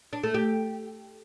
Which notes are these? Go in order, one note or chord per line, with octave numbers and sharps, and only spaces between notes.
D4
A3
G4